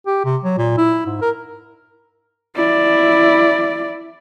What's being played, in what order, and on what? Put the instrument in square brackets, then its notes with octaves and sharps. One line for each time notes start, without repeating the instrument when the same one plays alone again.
[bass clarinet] G4
C3
F#3
A#2
E4
G#2
A#4
[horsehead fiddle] E4 D5